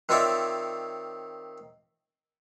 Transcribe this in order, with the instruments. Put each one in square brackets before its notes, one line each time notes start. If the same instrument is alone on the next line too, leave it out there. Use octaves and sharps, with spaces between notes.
[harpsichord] D#3 C4 F4 C#5 D5 E5